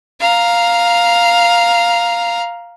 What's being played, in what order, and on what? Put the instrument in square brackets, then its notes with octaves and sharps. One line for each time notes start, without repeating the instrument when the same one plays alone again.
[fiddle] F5 A#5